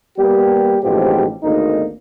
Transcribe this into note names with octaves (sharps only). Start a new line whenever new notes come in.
G3 A#3 B3 G4
A1 G#2 B2 F3 C4 G4
G#1 D2 A#3 D#4